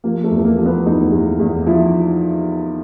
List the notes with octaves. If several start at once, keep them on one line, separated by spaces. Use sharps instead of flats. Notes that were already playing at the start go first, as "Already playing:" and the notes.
F3 A#3
A3
E2
A3
A#3
F3
B3
E2 D#4
E2
E2
F3 E4